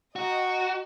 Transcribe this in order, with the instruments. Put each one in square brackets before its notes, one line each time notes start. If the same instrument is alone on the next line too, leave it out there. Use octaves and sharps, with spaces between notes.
[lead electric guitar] F#4 [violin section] D#5 G5 A#5